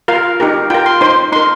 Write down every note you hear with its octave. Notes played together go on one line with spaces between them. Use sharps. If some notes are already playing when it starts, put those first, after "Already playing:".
F4 A#4 F5
D#4 G4 A#4
F4 A#4 G5
C6
D#4 C5 C6
D#4 A#4 C6